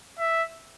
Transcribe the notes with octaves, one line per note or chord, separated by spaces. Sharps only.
E5